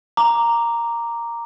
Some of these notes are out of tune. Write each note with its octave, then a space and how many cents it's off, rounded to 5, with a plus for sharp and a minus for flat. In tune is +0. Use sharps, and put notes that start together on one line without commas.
A#5 +0 D6 +0